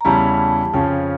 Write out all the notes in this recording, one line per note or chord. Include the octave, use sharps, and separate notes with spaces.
A#5
E2 C#3 G3 C#4 E4 A5
F2 C#3 F3 C#4 G5